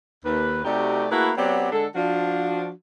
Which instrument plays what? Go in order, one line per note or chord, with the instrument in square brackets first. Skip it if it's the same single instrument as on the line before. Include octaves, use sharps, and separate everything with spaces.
[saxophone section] D#2 B4
C3 A3 D#4 F#4 G4 D5
A3 A#3 E4 F#4 G#4 B4
F#3 B3 C4 G4 C#5 D5
D3 G#3 D4 A4
F3 D4 F#4